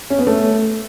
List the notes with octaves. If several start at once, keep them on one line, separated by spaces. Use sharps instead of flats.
C#4
B3
A3